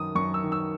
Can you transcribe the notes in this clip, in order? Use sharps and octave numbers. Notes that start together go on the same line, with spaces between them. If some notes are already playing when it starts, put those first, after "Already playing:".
Already playing: F#2 D#3 D#6
F#2 C#6
E6
D#3
E6